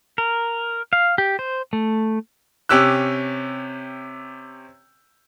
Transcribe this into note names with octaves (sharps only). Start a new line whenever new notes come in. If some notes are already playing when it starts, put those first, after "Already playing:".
A#4
F5
G4
C5
A3
C3 C#4 G4 E6 F#6